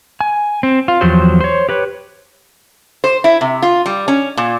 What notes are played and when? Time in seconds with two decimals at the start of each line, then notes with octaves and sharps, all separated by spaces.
0.21 G#5
0.63 C4
0.88 F4
1.01 E2 F3 F#3 G4 C5
1.41 C5 C#5
1.69 G4 B4 C#5
3.04 C5
3.24 E4
3.41 C3
3.62 F4
3.86 G3
4.08 C#4
4.37 A#2